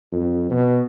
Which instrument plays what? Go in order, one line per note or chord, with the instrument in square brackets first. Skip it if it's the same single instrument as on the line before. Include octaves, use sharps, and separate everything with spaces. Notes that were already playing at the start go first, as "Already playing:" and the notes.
[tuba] F2
B2